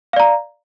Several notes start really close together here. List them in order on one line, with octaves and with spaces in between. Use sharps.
F5 D5 A#5